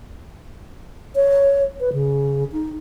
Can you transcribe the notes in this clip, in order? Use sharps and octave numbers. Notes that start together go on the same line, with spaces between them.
C#5
B4
C#3
D#4